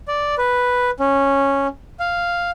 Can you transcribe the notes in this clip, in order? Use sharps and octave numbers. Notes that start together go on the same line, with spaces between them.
D5
B4
C#4
F5